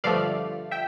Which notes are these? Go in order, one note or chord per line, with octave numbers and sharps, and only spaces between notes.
G2 D3 F3 A3 D5 F5
E5 G5